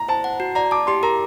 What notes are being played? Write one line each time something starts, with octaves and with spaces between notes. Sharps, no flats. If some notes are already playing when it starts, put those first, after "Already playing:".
Already playing: A#5
C5 A5
F#5
F#4
D5 A#5
A5 D6
G4 C6
A#4 A#5